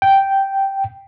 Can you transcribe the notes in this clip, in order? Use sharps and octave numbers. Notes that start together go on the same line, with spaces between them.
G5